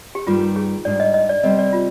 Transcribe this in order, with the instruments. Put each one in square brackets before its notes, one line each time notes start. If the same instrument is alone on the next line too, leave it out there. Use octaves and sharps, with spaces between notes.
[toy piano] G4
[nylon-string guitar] G2 D#3 G3 A#3 [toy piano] F4
[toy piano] G#4
[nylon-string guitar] G#2 G3 D4 [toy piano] D5
[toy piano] D#5
D#5
D5
[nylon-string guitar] C3 G3 C4 [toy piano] D#5
[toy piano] D5
F4